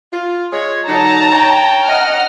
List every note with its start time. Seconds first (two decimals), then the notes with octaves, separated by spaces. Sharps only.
0.12 F4
0.51 G#3 G#4 C#5
0.88 D3 F#3 D#4 A5 A#5
1.32 C#5 G5
1.86 D#5 F#5 F6